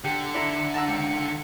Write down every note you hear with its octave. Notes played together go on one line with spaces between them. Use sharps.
D3 G4 C#7
D4 E4 A#5
F#5 A5 A#5 E6
C#2 C#7